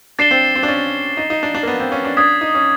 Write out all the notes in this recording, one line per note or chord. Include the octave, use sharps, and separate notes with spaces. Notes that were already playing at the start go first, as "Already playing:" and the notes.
D4 A6 C7 E7 G7
C4
C4
D4
C#4
D#4
D#4
D4
D4
A#3
B3
C4
C#4
D4
D4 D#6 G#6 B6
D#4
C#4